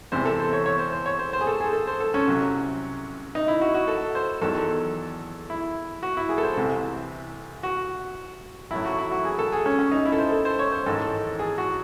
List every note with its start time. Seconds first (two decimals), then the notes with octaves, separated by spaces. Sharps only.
0.12 E2 C3 E3 C5
0.25 A4
0.40 C5
0.53 C#5
0.66 C#5
0.79 C5
0.92 C5
1.06 C#5
1.19 C5
1.33 C5
1.41 G#4
1.47 A4
1.61 G#4
1.73 A4
1.87 C5
2.00 A4
2.14 C#4
2.28 C2 C3 F#3
3.35 D#4
3.48 E4
3.61 F#4
3.74 F#4
3.88 A4
4.15 C5
4.42 E2 D#3 F#3 A4
5.50 E4
6.03 F#4
6.17 E4
6.29 G#4
6.38 A4
6.43 C5
6.57 C2 C3 E3
7.63 F#4
8.71 A1 A2 F#3 E4
8.85 F#4
8.99 E4
9.11 F#4
9.25 G#4
9.39 A4
9.52 G#4
9.66 C#4
9.79 C#4
9.91 D#4
10.06 E4
10.12 A4
10.18 C5
10.32 A4
10.45 C5
10.59 C#5
10.72 C5
10.86 A1 G#2 D#3 A4
11.39 G#4
11.58 F#4